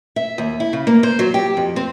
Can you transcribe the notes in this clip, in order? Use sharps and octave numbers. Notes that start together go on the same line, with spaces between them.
E5
D#2
E4
C#3
A#3
C5
F#3
G4
F2
C4